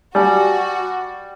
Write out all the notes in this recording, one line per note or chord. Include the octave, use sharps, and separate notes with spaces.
G3 F#4 G#5 A5 E6